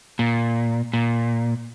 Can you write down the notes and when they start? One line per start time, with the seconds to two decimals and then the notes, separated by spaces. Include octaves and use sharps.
0.19 A#2
0.93 A#2